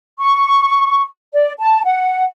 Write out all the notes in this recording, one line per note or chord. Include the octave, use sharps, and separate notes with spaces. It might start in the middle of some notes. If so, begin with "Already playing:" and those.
C#6
D5
A5
F#5